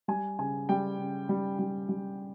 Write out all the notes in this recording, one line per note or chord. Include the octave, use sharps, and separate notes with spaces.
G3 G#5
C#3 G#5
G3 G5
C#3
G3
G3
G3